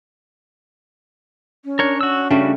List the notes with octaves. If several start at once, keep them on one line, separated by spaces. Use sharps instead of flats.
C#4
D4 A#4 C#5
F#4 E6
C#3 G3 A3 D4 F#4